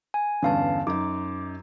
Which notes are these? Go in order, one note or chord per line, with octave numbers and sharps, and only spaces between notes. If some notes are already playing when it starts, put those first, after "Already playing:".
G#5
E2 G2 D3 C#4 F5 A5
F#2 D#4 D6